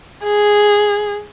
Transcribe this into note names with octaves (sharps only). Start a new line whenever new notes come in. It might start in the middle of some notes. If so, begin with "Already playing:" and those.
G#4